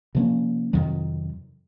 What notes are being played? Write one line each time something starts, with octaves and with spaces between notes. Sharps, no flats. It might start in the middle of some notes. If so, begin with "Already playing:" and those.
C3 F3 A#3 C#4
F2 C3 D#3 F#3